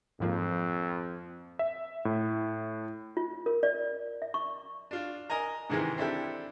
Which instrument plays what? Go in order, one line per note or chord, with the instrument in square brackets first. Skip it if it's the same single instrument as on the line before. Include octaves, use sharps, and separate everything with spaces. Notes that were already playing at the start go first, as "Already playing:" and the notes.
[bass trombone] F2 [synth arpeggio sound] G#2 F3 A#3
[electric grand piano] E5
A2
[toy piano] F4
A#4
D5
E5
C#6
[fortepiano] D4 F4
A#4 D#5 G#5 A#5
G#2 C3 D#3 E3 G#3
C4 D4 E4 G4 A4